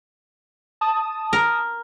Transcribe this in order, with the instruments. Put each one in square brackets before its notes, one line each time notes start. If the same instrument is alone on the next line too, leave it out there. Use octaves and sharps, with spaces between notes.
[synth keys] A5 D#6
[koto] A#4